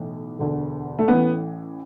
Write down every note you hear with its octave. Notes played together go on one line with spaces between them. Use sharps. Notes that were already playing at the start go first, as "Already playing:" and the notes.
Already playing: B1 A2 E3
E1 D2 D3
A3
A1 A2 E3 B3